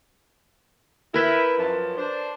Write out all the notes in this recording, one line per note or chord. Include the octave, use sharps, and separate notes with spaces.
E4 A#4 B4 G5
F#2 F3 A5
D4 C5